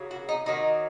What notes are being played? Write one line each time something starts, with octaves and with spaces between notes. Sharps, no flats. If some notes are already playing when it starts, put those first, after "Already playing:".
Already playing: C#3 F#3 A#3
F#4
D#4
D#3 F#3 A#3 D#4